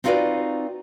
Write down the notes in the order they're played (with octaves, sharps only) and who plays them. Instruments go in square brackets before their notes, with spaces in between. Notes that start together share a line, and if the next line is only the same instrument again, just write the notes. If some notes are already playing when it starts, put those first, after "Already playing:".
[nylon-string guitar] C4 D#4 F4 F#4 B4 D5